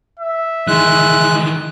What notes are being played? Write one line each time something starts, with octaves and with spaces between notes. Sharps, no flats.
E5
D#3 E3 G#3 F#6